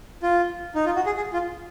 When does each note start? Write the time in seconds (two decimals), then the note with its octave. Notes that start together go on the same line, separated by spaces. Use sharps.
0.22 F4
0.75 D#4
0.86 F4
0.96 F#4
1.06 G#4
1.16 G#4
1.33 F4